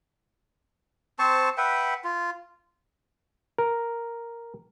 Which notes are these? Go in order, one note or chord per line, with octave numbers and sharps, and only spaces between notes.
C4 C5 A5 C#6
B4 E5 F#5 G5
F4
A#4